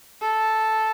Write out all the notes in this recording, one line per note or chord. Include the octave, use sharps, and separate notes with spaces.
A4